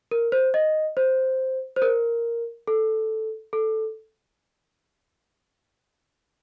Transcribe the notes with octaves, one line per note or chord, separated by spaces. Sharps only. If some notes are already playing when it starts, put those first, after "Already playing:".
A#4
C5
D#5
C5
C5
A#4
A4
A4